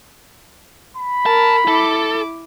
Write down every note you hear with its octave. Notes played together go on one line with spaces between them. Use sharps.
B5
A#4 A5
E4 A4 D6